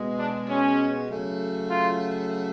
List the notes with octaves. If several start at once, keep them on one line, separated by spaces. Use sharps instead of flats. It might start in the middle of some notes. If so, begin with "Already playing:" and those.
Already playing: B2 G#3
D4
C#4
C#3 F#3 A3
F4